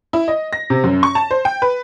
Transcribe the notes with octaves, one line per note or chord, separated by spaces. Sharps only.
E4
D#5
A#6
C3
F#2
C#6
A5
C5
G5
B4